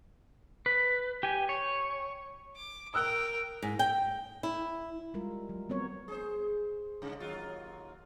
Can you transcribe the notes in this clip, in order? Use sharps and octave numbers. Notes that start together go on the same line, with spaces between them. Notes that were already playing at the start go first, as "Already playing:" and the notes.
B4
G4 G#5
C#5
D6
A#4 G5 D#6 E6 F#6
G#2
G5
E4
G3 G#3 F4 A#4
F#3
G3 B3 C4 A#4 C#5
G#4 C5
G2 C#3
D#2 F#3 F4